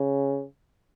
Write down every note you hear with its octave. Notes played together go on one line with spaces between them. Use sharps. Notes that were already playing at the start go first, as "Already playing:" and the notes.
Already playing: C#3